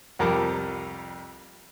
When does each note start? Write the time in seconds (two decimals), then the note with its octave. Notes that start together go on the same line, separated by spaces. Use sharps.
0.19 C2 F2 G3 A#4 A5 D6